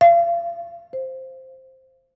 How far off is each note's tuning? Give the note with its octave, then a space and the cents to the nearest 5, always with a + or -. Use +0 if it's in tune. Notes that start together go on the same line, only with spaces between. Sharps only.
F5 -35
C5 +5